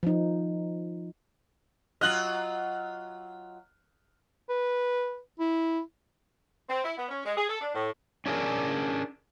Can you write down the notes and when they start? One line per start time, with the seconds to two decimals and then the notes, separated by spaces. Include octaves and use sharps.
0.03 F3 D#4
2.01 F#3 F4 D#5 F6 F#6 F#7
4.49 B4
5.39 E4
6.68 C4
6.83 E4
6.97 B3
7.09 C#4
7.24 G#3
7.36 G#4
7.48 A4
7.60 D4
7.74 A2
8.26 C#4 D4 G#4 A#4 D5